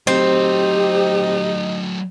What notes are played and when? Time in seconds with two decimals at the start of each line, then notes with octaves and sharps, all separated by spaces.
0.07 F#3 A3 C4 D#4 G4